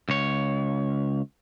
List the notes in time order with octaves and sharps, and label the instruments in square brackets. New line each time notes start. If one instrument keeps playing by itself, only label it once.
[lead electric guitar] C#2 C#5